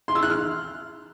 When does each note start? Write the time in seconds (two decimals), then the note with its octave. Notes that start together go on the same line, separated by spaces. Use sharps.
0.08 C6
0.15 E6
0.23 F#6
0.30 F6